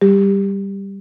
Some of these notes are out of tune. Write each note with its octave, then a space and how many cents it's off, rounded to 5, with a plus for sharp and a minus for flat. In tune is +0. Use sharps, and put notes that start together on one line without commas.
G3 +0 G4 +20